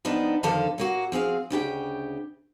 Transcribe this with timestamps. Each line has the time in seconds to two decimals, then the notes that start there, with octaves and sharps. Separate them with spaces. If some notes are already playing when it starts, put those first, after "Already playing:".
0.05 F2 F3 B3 D4 D#4
0.43 F2 D3 D#3 F3 A4 F5
0.78 F#3 A#3 F#4
1.12 F3 C4 G#4 F5
1.50 D2 C#3 G4 G5